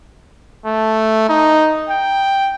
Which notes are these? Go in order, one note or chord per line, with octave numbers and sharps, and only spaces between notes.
A3
D#4
G5